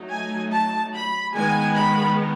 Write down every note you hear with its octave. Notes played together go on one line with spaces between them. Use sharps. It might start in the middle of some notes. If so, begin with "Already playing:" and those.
Already playing: F#3 A3 D#4
G#5
A5
B5
D#3 G#3 B3 G#5
B5